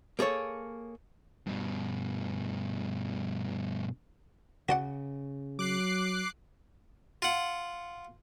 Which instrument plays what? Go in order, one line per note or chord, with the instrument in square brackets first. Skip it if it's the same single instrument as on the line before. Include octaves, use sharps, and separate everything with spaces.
[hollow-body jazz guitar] A#3 G#4 A4 C#5
[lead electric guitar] G2 B2
[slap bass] C#3 [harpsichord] F#4 D5 F#5
[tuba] F#3 [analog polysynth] D6 F#6 C7
[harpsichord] F4 F#5